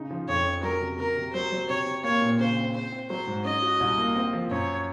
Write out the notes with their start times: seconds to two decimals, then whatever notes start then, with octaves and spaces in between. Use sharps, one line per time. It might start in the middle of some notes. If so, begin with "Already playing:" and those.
Already playing: C#3 D#4
0.11 F3
0.29 F2 C#5
0.46 C#4
0.63 F#3 A#4
0.81 C3
0.98 C3 A#4
1.17 C3
1.33 F#3 C5
1.52 F#3
1.69 C3 C#5
1.86 C3
2.04 A#3 C#5
2.22 A#2
2.39 C#3 C5
2.57 C4
2.74 C4 C5
2.92 C4
3.10 F#3 C5
3.27 G#2
3.45 C#4 D#5
3.62 F#4
3.80 C2
3.98 A#3
4.16 C4
4.33 F3
4.51 F#2 C#5